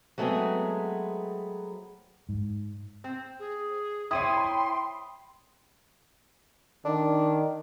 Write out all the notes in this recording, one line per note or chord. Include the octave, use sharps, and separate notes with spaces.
F#3 G#3 A3 B3 C4 G#4
G#2
C4
G#4
E4 C5 C#5 G5 C6 D#6 D#7
B5
D#3 D4